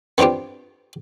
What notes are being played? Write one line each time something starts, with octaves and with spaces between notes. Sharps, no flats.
B3 C4 D4 F4 G4